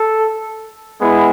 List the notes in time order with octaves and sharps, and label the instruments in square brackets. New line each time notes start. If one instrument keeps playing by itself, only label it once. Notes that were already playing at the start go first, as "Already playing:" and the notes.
Already playing: [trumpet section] A4
G#3 B3 E4